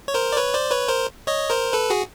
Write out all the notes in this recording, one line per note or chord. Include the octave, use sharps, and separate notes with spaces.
C#5
A#4 C5
D5
B4 C#5
C5 D5
B4 C#5
A#4 C5
C#5 D#5
A#4 C5
A4 B4
F#4 G#4